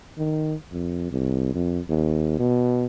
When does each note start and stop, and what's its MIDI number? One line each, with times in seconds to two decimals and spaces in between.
0.18 0.55 51
0.72 1.07 41
1.11 1.53 36
1.55 1.80 41
1.89 2.39 39
2.39 2.86 47